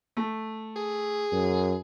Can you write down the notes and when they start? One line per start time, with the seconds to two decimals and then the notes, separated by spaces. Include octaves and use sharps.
0.17 A3
0.76 G#4
1.32 F#2